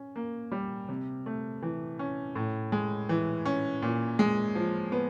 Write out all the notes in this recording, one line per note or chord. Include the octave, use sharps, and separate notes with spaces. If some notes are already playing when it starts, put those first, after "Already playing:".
Already playing: C#4
A#3
G3
C3
A3
E3
C#4
A2
G#3
E3
C#4
A#2
G#3
F3
B3